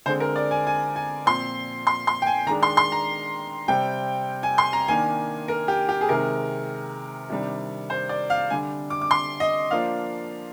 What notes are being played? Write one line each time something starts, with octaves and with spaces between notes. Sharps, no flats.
D3 G#3 C4 C5
A#4
D5
G#5
G#5
G#5
A#2 F3 C4 C6
C6
C6
G5
G#5
D#3 G#3 D4 A#5
C6
C6
A#5
C3 G3 C4 G5
G#5
C6
A#5
D#3 A#3 D4 G#5
A#4
G4
G4
G#4
C3 D#3 G#3 A#4
C3 D#3 G3 D4
C5
D5
F5
D3 G3 D4 G#5
D6
D6
C6
D#5
F3 A#3 D4 F5